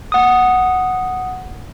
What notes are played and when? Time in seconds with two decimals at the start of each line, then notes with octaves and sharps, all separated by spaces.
0.12 F#5 D#6